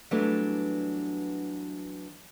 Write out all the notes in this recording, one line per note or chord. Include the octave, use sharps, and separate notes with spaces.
E3 F#3 G3 A3 B3 D4